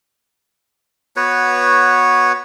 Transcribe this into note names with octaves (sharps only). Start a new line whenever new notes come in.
B3 F#4 B4 C#5